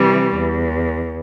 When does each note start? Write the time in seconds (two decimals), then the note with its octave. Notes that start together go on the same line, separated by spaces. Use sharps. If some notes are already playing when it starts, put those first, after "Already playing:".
Already playing: C3 E3 G3
0.35 E2